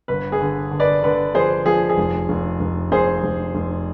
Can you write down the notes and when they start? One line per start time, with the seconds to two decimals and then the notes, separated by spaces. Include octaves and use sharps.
0.08 G1 B4
0.32 G#4
0.41 D3
0.71 D3
0.80 B4 D5
1.03 D3 B4
1.35 F3 G#4 C5
1.66 F3 G#4
1.89 G#4
1.97 F1
2.29 F1
2.60 F1
2.92 F1 G#4 C5
3.23 F1
3.55 F1